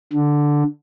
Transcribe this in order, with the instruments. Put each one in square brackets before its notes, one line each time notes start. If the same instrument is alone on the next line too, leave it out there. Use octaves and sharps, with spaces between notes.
[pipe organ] D3